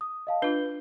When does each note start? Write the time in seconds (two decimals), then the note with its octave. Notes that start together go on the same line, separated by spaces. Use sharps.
0.01 D#6
0.27 D#5 F5 A5
0.42 D4 F4 B4 G6 G7